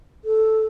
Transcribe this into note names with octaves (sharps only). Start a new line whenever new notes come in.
A4